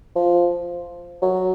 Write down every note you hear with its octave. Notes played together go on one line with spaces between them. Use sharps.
F3
F#3